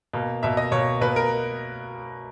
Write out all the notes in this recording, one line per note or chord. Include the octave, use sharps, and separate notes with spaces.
B2 A#3
B2 A#3 E5
D#5
B2 A#3 C#5
B2 A#3 B4
A#4